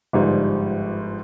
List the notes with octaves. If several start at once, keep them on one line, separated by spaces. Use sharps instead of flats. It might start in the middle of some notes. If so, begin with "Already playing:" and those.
G1 G#2 F3 G3